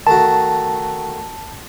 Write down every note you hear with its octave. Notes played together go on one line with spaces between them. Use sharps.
D#3 A3 F#4 A5